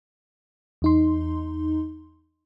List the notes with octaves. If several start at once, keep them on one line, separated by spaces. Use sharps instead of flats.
E2 D#4 C6